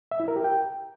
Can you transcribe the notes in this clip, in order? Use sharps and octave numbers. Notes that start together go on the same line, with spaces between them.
E5
E4
A#4
G4
G5